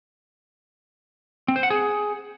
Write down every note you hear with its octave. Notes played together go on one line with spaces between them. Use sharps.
C4
C5
F#5
G#4